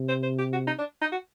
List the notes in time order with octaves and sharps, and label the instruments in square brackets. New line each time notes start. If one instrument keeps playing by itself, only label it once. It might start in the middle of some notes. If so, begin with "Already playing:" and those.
Already playing: [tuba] C3
[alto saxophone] C5
C5
G4
F#4
D#4
D4
D#4
F#4